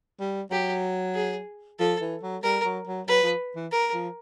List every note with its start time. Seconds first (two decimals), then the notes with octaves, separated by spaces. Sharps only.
0.20 G3
0.51 F#3 G4
1.15 G#4
1.79 F3 A4
2.01 E3
2.22 F#3
2.43 G3 A#4
2.65 F#3
2.87 F#3
3.07 F#3 B4
3.23 F3
3.56 E3
3.72 A#4
3.94 F3